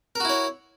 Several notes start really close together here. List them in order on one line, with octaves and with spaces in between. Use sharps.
A#4 F#4 E4 C#5